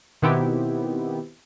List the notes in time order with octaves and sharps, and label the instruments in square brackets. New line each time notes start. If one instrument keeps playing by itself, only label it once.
[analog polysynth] B2 D#3 B3 C4 E4 G4